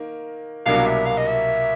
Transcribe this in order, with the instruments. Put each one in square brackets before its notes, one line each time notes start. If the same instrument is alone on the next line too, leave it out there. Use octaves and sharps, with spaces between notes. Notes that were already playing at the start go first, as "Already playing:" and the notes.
Already playing: [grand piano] D#3 A#3
[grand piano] C2 B2 F#3 A#3 D4 [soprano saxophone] F5
[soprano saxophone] E5
F5
D#5
E5